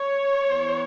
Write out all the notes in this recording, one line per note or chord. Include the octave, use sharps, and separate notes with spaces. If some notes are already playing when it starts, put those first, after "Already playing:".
Already playing: C#5
E3 B3